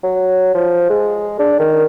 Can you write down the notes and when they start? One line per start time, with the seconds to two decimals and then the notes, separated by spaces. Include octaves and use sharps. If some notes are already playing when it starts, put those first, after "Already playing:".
0.03 F#3
0.55 F3
0.90 G#3
1.39 D4
1.60 D#3